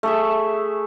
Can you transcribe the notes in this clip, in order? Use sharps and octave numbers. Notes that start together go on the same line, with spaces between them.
A3 G#4 E5